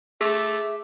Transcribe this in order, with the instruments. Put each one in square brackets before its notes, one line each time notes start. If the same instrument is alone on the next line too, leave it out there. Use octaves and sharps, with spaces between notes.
[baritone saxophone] A3 [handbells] G#4 [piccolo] E5 [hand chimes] D6 E6 B6